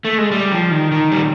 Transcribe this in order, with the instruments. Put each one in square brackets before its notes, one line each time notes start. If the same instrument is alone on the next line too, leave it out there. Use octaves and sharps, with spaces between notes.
[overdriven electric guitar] A3
G#3
G3
F3
D#3
D#3
G3